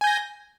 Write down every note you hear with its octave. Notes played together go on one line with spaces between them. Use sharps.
G#5 G6 A#6